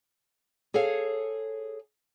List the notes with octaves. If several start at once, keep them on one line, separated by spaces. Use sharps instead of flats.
G#4 A4 C#5 F5